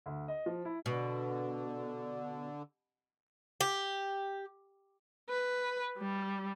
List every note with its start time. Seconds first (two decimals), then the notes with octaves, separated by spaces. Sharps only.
0.06 D2
0.28 D#5
0.46 F3
0.65 E4
0.86 B2 D3
3.61 G4
5.29 B4
5.98 G3